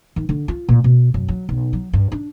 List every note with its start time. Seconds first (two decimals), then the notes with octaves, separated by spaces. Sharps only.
0.16 D#3
0.29 D3
0.48 F4
0.69 A#2
0.84 B2
1.14 F#2
1.28 F#3
1.49 B1
1.73 F#3
1.93 G2
2.12 D4